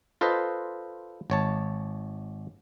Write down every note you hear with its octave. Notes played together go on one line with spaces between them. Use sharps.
F4 A4 B4 C5 D#5
G#1 C#5 A5